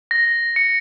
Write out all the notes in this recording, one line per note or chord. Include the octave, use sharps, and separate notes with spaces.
A#6
C#7